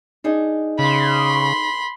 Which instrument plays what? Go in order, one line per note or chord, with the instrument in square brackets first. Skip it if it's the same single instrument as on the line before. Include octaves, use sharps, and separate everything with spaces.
[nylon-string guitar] D4 D#4 G#4
[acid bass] C#3 [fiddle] B5 C6